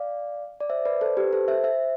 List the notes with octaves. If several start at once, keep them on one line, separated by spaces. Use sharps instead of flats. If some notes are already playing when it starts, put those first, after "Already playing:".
Already playing: D5 F5
D5
C5 E5
B4 D5
A4 C5
G4 B4
A4 C5
C5 E5
C5 E5